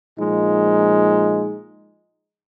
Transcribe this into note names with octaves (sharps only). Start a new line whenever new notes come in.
A#2 F3 G#3 D#4